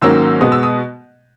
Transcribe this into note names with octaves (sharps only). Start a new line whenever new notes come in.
G#2 D#3 F#3 A#3 C#4 E6
B2 G#3 B3 D#6
E6
D#6